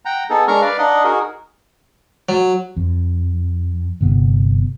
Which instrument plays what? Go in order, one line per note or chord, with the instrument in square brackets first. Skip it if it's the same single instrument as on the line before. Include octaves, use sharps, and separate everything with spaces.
[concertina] F#5 G5 A#5
B3 D#4 G#4 A4
G#3 D4 A#4 A#5 C#6 F6
B4 D5 F5
D4 D#4 D#5 F#5
D#4 F#4 G#4 A#4
[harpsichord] F#3
[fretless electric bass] F2
G1 C3 B3